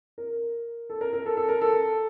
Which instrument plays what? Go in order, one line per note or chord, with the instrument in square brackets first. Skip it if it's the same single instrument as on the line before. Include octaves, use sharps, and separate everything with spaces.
[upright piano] A#4
A4
A#4
A#4
A4
A4
A#4
A4